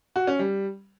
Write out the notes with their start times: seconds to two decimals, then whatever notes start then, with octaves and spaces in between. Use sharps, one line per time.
0.16 F#4
0.27 C#4
0.39 G3